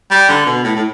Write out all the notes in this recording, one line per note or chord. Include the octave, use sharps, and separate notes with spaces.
G3
D3
B2
A2
A2